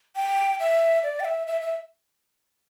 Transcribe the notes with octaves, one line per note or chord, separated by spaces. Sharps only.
G5
E5
D5
G5
E5
E5
E5